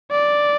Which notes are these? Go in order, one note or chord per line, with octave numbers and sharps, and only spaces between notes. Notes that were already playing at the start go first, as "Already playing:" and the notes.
D5